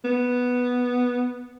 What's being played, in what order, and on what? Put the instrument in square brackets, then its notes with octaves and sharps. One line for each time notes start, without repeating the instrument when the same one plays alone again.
[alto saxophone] B3